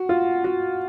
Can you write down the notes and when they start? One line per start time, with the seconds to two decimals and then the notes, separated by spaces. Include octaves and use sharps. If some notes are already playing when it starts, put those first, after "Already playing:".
Already playing: F#4
0.09 F4
0.44 F#4